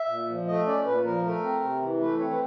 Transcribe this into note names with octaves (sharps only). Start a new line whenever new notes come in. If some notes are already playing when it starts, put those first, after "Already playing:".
Already playing: E5
A#2
F3
A3 D#5
C#4 D5
A#2 B4
F3 A#4
A3 A#4
C4
C3
E3
A3 B4
C4 C#5
B4